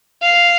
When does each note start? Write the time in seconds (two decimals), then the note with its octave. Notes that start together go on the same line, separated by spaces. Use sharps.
0.23 F5